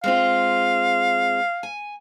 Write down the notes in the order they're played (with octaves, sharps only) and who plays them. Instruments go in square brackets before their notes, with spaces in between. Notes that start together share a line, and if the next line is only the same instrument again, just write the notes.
[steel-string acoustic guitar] G#3 C4 F4 [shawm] F5
[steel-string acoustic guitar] G#5